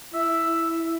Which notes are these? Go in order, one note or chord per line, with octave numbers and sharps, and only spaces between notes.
E4 E5